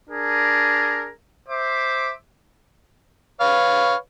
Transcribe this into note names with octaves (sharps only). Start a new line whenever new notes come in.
D4 G#4 A#4
C5 E5 D6
B4 C#5 F5